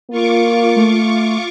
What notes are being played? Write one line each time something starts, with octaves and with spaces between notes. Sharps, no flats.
A#3 F4 C#6 D6
A3